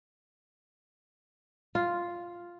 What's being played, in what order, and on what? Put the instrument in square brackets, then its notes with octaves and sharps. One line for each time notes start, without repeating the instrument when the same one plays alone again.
[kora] F4